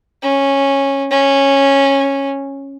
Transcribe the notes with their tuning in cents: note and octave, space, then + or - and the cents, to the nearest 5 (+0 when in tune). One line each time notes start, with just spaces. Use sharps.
C#4 -10
C#4 -10